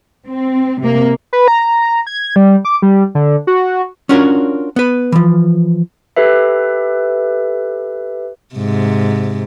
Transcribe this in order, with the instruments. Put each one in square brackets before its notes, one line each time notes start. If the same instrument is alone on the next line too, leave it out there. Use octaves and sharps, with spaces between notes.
[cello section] C4
C3 A#3
[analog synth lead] B4
A#5
G#6
G3
D6
G3
D3
F#4
[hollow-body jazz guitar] C#4 D4 F4 F#4 A#4 C#5
B3 B4
E3 F3
[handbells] G4 A4 B4 E5
[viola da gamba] G#2 C3